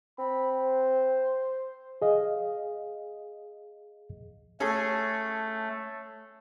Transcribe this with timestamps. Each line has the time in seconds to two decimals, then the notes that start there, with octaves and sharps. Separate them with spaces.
0.19 C4 B5
0.58 C5
2.02 G#4 D#5 F5
4.60 A3 C#4 G#4 A4